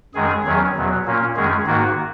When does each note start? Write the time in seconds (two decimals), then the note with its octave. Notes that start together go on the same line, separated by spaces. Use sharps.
0.14 F#2 D#3 G#3 G#4
0.45 E2 D#3 F#3 C#4
0.76 E2 B2 F#3
1.05 A#2 A#3 C#4
1.36 F#2 D#3 G#3 C#4 G#4
1.66 G#2 D#3 A#3 F#4